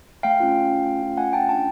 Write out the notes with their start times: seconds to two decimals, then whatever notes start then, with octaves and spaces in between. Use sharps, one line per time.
0.23 A3 F5 G5
0.40 C#4 F4
0.56 A3
0.71 C#4 F4
0.86 A3
1.02 C#4 F4
1.17 A3 F#5 G#5
1.33 C#4 F4 G5 A5
1.49 D4 G5 A5